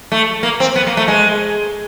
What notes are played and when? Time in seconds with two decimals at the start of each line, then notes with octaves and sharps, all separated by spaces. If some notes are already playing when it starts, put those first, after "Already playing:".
0.12 A3
0.43 A#3
0.60 C4
0.76 B3
0.87 A#3
0.97 A3
1.08 G#3